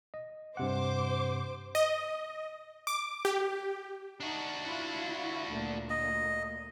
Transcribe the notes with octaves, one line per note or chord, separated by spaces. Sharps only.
D#5
G2 C3 C5 F#5 D6
D#5
D6
G4
D4 D#4 F#4
E4 F4
D2 A#2
D#5